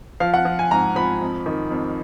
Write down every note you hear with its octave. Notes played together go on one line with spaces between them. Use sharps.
F3 F5
F#5
F3
G#5
G#2 A#5
F3 B5
F2
D#3
F2